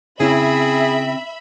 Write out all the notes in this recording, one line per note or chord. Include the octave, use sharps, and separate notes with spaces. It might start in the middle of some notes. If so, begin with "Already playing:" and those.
C#3 C4 E4 G#4 E5 B5